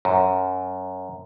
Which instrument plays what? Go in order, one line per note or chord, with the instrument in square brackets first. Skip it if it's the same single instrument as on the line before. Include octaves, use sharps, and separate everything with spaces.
[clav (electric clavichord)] F#2